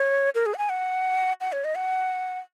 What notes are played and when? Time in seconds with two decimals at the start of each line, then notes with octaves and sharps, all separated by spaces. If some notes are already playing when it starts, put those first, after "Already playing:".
Already playing: C#5
0.35 A#4
0.46 G#4
0.54 F#5
0.58 G#5
0.69 F#5
1.41 F#5
1.52 C#5
1.64 D#5
1.75 F#5